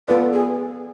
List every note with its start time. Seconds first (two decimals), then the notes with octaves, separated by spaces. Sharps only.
0.08 B3 F4 A4 B4 D5
0.33 G#4